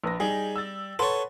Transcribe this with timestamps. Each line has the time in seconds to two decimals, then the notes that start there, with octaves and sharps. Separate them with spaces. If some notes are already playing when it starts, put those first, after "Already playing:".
0.04 A#1 B4 A#6
0.20 G3 D#4 G#4
0.56 E6 A6
0.99 A4 B4 C#5 F#5 C6